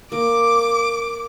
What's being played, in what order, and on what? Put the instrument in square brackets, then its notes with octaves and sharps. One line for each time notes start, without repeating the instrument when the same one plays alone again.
[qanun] A#3 [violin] D6